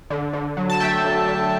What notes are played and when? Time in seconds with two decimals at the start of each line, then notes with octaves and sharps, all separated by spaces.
0.10 D3
0.33 D3
0.57 F#3
0.70 A5
0.80 A3 E5 G5
1.04 D3
1.27 D3